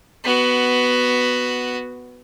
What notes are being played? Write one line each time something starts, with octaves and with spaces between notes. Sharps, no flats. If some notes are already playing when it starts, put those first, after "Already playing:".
B3 F#4